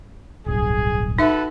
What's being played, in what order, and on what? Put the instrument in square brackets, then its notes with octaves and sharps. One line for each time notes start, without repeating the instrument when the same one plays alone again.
[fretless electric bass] D1 B1 G2 [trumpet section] G#4
[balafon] D#4 E5 [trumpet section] F#4 A4 B4